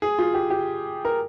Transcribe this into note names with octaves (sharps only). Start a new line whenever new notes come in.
G#4
F4
G4
G4
A#4